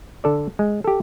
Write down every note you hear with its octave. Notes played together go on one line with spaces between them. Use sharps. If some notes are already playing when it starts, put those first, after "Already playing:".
D3 A4 D5
G#3
G4 A4